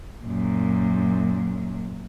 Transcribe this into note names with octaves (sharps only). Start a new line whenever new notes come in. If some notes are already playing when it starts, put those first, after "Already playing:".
F#2 A#2